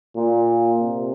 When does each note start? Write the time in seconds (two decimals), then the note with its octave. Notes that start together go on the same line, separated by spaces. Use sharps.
0.16 A#2
0.81 C3